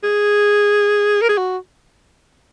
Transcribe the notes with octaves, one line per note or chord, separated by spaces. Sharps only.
G#4
A#4
G#4
F#4